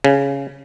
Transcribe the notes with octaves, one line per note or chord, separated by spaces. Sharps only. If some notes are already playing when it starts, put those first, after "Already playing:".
C#3